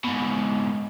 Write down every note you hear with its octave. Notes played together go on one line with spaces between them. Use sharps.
G#2 B2